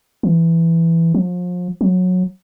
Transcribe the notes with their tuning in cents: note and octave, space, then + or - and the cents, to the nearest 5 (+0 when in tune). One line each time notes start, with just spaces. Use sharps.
E3 +10
F3 +35
F#3 -20